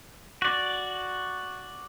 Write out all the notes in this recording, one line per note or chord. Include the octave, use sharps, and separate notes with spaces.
F#4 D5